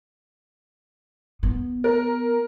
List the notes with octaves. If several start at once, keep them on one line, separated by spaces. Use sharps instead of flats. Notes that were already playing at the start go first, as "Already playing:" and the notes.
B3
A#4